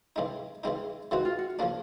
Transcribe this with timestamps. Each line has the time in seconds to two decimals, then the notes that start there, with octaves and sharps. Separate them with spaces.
0.16 C#3 E3 G#3 C4 D#4
0.64 C#3 E3 G#3 C4 D#4
1.11 C#3 E3 G#3 C4 D#4 F#4
1.25 F4
1.39 F#4
1.59 C#3 F3 A#3 D4